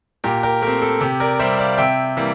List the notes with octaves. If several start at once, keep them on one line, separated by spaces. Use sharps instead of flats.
A#2 G4 A#4
G4 A#4
A3 C4 G4 A#4
A4
C3 G4
A#4 D5
G3 C4 C5 E5
D5 F5
C3 E5 G5
E3 G3 A#3